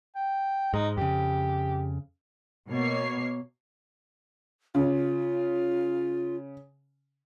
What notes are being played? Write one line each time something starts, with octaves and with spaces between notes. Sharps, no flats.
G5
G#2 G#3 D#4
F2 C#3 G4
B2 A#3 C#5 C7
C#3 F4